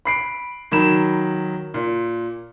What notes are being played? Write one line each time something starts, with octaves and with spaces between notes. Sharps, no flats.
B5 C7 D7
D#3 F#3 B5 E7
A#2